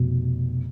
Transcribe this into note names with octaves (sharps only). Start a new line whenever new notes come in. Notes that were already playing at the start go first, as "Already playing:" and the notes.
Already playing: F1 B2